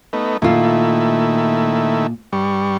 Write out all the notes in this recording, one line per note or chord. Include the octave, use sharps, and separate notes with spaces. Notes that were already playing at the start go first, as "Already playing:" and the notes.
A3 B3 D#4
A#2 D#3 A3 E4 F4
G2 G3 C#6